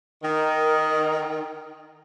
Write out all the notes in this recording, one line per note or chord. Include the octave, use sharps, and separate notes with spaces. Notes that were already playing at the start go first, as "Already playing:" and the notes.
D#3 A#4